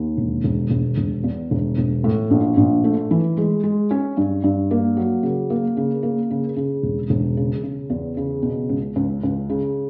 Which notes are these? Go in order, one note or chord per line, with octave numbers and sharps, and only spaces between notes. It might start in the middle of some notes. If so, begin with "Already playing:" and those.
Already playing: D#2
E1
E1
E1
E1
E2
E1
E1
A2
A#1
A#1
A3
E3
G#3
G#3
C#4
G2
G2
A#3
F#3
C#3
A#3
C#3
A#3
C#3
C#3
E1
E1
C#3
C#3
E2
C#3
B2
C#2
C#2
C#2
C#3